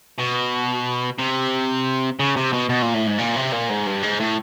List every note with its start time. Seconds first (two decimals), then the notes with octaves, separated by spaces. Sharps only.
0.19 B2
1.18 C3
2.19 C#3
2.36 C3
2.53 B2
2.69 B2
2.82 A#2
2.94 A2
3.07 G#2
3.19 A#2
3.36 C3
3.53 A#2
3.70 G#2
3.87 G2
4.03 G#2
4.20 A2